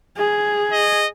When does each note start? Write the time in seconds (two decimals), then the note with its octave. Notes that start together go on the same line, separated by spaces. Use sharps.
0.17 G#4
0.72 D#5